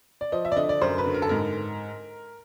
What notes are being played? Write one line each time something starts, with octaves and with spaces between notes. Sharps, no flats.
D5
F3 D#5
E5
D5
D3 D#5
D5
F#2 C5
B4
D3
A#4
A4
G#2 A#4